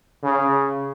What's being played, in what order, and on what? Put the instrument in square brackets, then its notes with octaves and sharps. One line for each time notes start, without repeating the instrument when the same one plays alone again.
[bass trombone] C#3